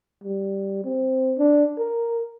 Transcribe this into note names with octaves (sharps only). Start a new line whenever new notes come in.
G3
C4
D4
A#4